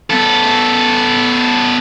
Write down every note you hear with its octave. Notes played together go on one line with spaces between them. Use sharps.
B3 A4